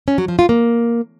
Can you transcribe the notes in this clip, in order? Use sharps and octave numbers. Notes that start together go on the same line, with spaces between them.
C#4
F#3
F3
F4
A#3